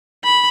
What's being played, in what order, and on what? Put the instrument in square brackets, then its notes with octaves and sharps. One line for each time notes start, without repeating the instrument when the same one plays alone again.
[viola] B5